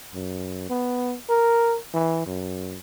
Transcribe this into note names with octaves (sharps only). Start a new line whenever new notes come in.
F#2
B3
A#4
E3
F#2